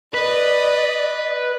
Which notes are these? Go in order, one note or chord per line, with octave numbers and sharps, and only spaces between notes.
B4 D5 D#5